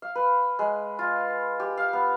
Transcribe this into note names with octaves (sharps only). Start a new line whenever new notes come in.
F5
B4
G#3
F4
G4
F5
B3